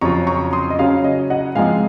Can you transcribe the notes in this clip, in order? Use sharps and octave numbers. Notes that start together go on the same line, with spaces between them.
F2 C#3 F#3 C#4 F4 A#5 C#6
A#5 C#6
C6 D#6
D#5
C#3 F#3 C#4 F5
D#5
D#5 F#5
G#2 F3 G#3 C4 D#4 F5 G#5